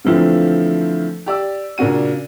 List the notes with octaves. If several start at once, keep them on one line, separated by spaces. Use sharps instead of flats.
D3 E3 F3 A3 C4
G4 D5 E6
A#2 C#3 D4 F#4 D#7